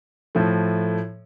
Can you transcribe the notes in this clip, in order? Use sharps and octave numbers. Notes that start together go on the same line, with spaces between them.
A2 F3 A3